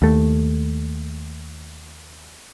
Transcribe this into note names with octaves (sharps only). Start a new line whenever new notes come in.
D#2 A3